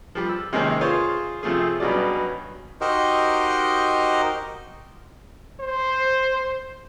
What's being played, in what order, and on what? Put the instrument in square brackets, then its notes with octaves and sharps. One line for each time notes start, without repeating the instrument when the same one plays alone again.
[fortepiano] F3 G3
E6
C3 D#3 G#3 A#3 C4 C#4
F4 G#4 C5 C#5
C3 F3 A3 F4 G#4
G2 B2 F#3 C#4 F#4 D5
[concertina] D#4 F#4 G4 A#4 C5 D#5
[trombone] C5